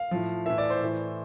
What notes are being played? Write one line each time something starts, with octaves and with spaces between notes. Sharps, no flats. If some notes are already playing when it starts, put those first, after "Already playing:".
Already playing: F5
A2 F3
A2 E3 E5
D5
C5
A2 E3